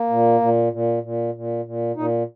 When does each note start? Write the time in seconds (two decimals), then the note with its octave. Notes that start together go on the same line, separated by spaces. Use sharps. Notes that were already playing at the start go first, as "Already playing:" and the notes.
Already playing: A#3
0.10 A#2
0.40 A#2
0.73 A#2
1.03 A#2
1.34 A#2
1.65 A#2
1.96 A#2 D#4